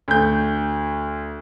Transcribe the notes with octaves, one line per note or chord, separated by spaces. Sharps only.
D2 G6